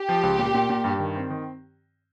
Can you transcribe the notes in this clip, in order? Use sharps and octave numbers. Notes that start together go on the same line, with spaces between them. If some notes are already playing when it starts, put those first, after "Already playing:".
Already playing: G4
F3
C#2
A#2
A#2
A#2
G2
D#3
C4
D#3